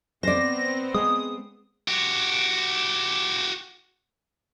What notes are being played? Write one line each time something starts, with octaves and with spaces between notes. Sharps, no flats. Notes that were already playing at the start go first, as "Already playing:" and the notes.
B3 C4 C5 D5 A#6
G#3 D#6
F#4 G4